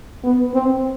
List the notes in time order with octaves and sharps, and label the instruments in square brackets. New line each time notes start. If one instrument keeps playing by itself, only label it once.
[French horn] B3
C4